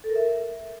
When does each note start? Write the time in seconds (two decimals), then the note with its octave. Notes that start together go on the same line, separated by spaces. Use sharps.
0.04 A4
0.10 A#4
0.16 E5